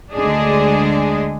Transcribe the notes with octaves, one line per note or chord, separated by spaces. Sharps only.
D2 D3 G#3 D4 G#4 D#5